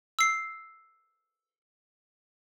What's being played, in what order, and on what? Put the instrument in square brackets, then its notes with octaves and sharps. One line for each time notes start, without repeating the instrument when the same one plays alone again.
[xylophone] E6 C7